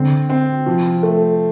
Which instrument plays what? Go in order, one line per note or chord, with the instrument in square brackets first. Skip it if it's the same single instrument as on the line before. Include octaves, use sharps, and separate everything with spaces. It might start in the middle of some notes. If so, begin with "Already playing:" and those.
Already playing: [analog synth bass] D3 [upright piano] C4
[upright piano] C4
[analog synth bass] C3 [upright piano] F3
[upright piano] A3